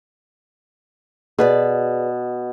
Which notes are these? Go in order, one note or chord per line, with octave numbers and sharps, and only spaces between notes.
B2 G#4 B4 D5